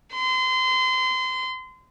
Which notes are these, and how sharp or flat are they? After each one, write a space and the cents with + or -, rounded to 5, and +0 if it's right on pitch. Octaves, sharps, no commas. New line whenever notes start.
C6 -30